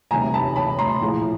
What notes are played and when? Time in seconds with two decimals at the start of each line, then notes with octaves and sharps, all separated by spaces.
0.11 E1 D2 C3 D#3 G3 G#5 A#5
0.34 A5 B5
0.56 A5 B5
0.79 A#5 C6
1.01 A#1 A2 E3 G#3